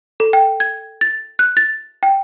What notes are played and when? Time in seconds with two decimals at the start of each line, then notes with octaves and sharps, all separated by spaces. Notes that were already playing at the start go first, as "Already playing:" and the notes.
0.20 A4
0.33 G5
0.60 G#6
1.01 A6
1.39 F#6
1.57 A6
2.03 G5